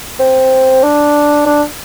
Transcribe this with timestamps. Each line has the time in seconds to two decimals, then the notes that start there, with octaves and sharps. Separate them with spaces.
0.19 C4
0.83 D4
1.46 D4